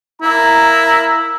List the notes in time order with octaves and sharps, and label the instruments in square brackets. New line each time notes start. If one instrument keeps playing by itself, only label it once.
[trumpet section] A#3 A#5 [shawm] E4